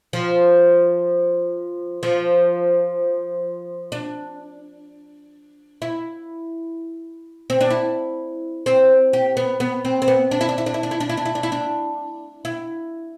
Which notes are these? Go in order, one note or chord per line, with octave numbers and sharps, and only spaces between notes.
F3
F3
D4
E4
C4
D4
E4
C4
G4
B3
B3
C4
C4
B3
D4
E4
D4
E4
D4
E4
D4
E4
D4
E4
D4
E4
D4
E4
D4
E4